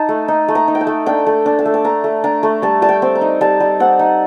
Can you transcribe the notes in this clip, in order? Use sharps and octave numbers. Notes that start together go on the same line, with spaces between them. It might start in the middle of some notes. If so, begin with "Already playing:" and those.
Already playing: D#4 A5
A3
D#4
A3
A#5
D#4
G5
A5
A3
D4 G5
A3
D4
A5
A3
A5
D4 A#5
A3
D4 A#5
A3
G3 A5
G3 A5
G5
C4
A#5
D#4
G3 A5
G3
C4 F#5
D#4